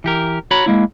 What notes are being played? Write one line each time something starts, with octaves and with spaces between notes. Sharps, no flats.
E3 G4 A#4
F#4 C#5 A#5 B5
G#3 A#3 E4